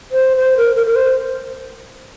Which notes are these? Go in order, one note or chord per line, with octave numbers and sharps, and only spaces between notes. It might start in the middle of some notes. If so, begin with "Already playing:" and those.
C5
C5
A#4
A#4
A#4
C5